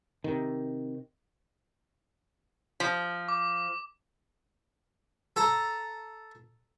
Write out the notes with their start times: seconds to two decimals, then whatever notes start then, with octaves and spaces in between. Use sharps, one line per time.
0.24 C3 D#3
2.80 F3
3.28 D6
5.36 A4 A5 A#5